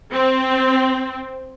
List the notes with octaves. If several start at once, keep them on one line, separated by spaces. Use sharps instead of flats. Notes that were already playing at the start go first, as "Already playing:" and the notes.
C4